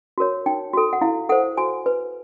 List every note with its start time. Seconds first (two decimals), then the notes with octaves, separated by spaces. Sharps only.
0.18 F#4 A#4 C#5
0.46 D#4 G5
0.73 F#4 A4
0.93 F#5
1.01 E4 F5
1.29 A4 C5 F#5
1.57 F#4 G#5
1.86 B4